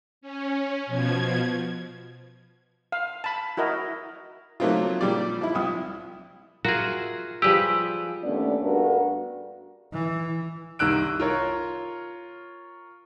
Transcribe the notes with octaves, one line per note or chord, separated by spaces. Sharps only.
C#4
B2 F3 G#6
F5
A5 B5
E4 F#4 A#4 D#5
F#3 A3 A#3 C4 D#4 F4
A#2 G3 D5
F3 E4
C2 D#6
F4 F#4 G#4 A#4 E5
F3 G3 G4 G#4 B4 E6
D#2 A3 B3 C#4 D4 D5
G2 B3 D4 F#4 A4 A#4
E3
C2 D#3 E6 F#6 D7
F4 A#4 C#5